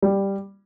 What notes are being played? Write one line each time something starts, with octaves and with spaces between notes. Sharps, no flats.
G3